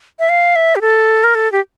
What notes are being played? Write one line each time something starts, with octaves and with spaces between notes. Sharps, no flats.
E5
F5
E5
G4
A4
A#4
A4
G4